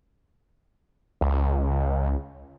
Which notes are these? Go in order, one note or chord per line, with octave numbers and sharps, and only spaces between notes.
C#2